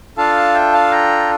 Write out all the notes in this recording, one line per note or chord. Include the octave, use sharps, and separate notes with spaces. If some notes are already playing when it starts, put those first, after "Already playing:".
D4 F4 A4 F5 A5
E5 G5
F5 A5
G5 A#5